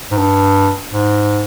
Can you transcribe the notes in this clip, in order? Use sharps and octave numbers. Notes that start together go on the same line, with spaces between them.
G#2
G2
G#2